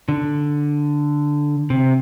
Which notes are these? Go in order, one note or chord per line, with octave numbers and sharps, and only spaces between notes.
D3
C3